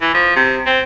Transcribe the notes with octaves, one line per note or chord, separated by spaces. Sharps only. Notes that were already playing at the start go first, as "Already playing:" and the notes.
E3
F3
C3
C4